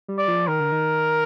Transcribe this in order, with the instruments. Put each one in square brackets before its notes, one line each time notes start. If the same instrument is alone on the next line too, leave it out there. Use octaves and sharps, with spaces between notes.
[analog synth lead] G3
[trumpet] D5
[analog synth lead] F3
[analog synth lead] D#3 [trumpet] A#4
[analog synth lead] D3
D#3